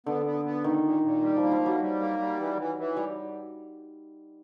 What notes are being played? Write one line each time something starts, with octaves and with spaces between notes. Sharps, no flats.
D3 B3
B3
B3
A#2 D#3
A#2
A#2
G3
F3
A#3
F3
F#3 G3
G3
A#3
G3
E3
E3
E3
G3